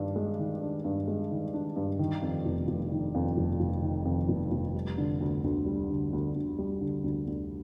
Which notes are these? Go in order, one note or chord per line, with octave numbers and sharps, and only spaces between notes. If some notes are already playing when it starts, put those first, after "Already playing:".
Already playing: G2 D#3 D4
G#3
D#3
D4
G2
G#3
D#3
D4
G2
D#3
F2
F1
F1
D#3
F2
F1
F1
D#3
F2
F1
F1
G3
D3
D2
D2
G3
D3
D2
D2
G3
D3
D2
D2